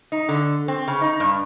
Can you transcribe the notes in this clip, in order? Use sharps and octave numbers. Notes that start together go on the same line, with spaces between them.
D#4
D3
C4
C#3
D#4
G2